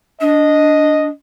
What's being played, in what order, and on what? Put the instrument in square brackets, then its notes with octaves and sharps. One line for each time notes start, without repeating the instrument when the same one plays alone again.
[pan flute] D4 [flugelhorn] D#5